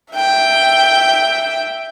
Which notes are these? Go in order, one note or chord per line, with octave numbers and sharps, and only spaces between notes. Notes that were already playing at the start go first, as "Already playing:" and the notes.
E5 G5